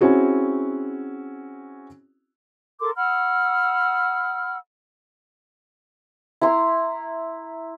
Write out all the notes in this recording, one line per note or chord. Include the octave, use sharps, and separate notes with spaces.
C4 C#4 E4 F#4 G#4
A4 A#4 C6 D6
F#5 B5 E6 F6
E4 A#5 C6